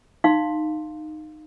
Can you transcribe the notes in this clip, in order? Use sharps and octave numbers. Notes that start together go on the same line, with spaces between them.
D#4 F5 C6